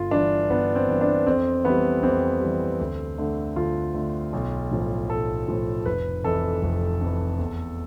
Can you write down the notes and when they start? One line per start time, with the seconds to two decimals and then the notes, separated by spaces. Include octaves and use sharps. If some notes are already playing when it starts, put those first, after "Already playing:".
Already playing: G1 F4
0.11 G2 E3 D4
0.50 G1 B3
0.75 C4
0.89 G2 E3
1.01 D4
1.26 F2 C4
1.65 E3 G3 B3
2.03 F2 C4
2.41 E3 G3
2.80 D2
3.18 D3 A3
3.56 D2 F4
3.94 D3 A3
4.33 B1
4.71 A2 F3
5.09 B1 A4
5.48 A2 F3
5.86 F1 B4
6.24 F2 E3 A4
6.63 F1
7.01 F2 E3
7.39 E2